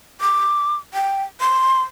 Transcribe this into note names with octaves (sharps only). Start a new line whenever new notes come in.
D6
G5
C6